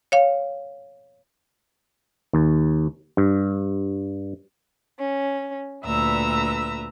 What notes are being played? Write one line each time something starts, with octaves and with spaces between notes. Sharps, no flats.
C#5 F5
D#2
G2
C#4
D2 A#2 B4 E5 A#5 E6